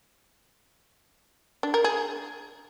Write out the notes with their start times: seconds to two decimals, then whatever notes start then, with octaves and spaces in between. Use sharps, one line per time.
1.63 D4
1.74 A#4
1.84 G#4